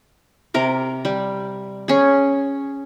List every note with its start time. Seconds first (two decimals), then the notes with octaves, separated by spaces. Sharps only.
0.54 C3 A#4 D6
1.05 G3
1.88 C#4 G#4